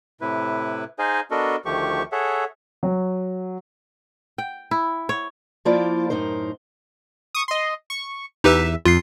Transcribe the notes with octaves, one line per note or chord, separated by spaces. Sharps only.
A2 C3 E4 B4
D#4 G#4 C5 D#5 F5 G#5
B3 D4 F#4 A4 A#4 D#5
D2 D#3 F3 A3 G4 C#6
G#4 A4 C#5 E5 F#5
F#3
G5
E4
C#5
F3 A#3 E4 F4 C5 D5
F#2 A2 D#4 A#4 C5
C#6 D#6
D#5 C6
C#6
E2 D#4 G4 B4 E5
F2 F4 C7